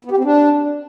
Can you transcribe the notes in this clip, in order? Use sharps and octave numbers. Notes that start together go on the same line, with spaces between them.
B3
G4
C4
D4